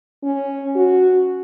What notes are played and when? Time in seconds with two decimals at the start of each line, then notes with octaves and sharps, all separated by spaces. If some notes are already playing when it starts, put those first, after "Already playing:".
0.23 C#4
0.75 F#4